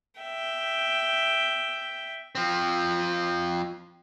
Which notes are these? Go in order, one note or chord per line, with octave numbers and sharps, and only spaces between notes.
E5 G5
F3 C4